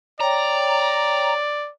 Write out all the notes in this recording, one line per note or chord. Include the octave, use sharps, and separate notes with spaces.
C#5 D5 G5 A#5